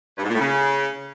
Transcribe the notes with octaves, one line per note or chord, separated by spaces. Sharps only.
G2
G#2
A#2
A2
C#3